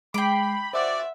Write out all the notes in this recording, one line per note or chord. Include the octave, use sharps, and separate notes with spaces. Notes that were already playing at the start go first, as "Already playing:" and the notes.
G#3 G5 B5 D6 C7
F#4 C5 D5 E5 F#5